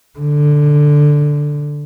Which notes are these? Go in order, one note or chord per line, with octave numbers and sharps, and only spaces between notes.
D3